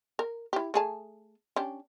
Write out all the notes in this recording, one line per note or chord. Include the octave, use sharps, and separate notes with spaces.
A#4
E4 G4
A3 G#4 A5
C#4 D4 G4